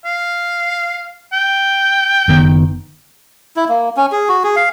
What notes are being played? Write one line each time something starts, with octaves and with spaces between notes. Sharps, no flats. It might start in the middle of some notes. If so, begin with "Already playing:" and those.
F5
G5
F#1 D#3 B3
E4
A#3
C#4
G#4
F#4
G#4
F5